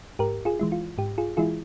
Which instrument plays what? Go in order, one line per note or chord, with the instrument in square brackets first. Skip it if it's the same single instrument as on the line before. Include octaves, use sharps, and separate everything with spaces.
[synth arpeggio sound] G#2 G4 A#4
F4 G#4
E3 G#3 E4
F4
G#2 G4
F4 G#4
E3 G#3 E4 F4 G#4